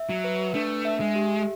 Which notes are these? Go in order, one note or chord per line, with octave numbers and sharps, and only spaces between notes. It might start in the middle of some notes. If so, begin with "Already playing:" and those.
Already playing: E5
F#3
B4
A3 D4
E5
G#3
G4